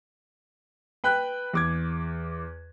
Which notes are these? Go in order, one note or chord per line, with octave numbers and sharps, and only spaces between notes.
B4 G5 B5 F#6
E2 D6 G#6